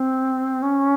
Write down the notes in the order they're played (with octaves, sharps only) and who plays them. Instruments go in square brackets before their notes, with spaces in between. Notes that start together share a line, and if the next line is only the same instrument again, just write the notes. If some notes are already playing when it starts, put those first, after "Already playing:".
Already playing: [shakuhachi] C4
C#4